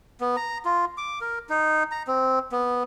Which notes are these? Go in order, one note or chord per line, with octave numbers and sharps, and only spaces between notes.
B3
A#5
F4
D6
A#4
D#4
A#5
C4
B3